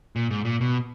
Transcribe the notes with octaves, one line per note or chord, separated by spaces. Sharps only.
A#2
G#2
A#2
B2